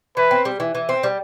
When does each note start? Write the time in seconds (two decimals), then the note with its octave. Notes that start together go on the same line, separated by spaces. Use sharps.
0.17 E3 B4
0.31 C4
0.45 G3
0.60 E3
0.75 E3
0.89 C4
1.03 G3